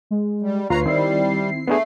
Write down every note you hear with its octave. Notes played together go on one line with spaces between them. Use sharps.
G#3
G3
D2 F4 B4 C#5 A#5 C7
D#3 G3 C4 E4
A3 B3 D4 G#4